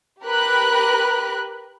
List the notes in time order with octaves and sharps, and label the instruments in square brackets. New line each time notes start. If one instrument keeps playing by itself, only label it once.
[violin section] G4 A#4 B4 B5 F#6